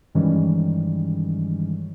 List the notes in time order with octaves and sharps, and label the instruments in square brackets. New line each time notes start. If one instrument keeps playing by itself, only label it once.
[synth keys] G2 D#3 E3 G3 G#3 C#4